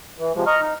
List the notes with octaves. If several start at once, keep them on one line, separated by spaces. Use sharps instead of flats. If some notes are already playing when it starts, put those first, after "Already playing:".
E3
C3 F3 G#3
D#5 A#5 C#6 F6
D#4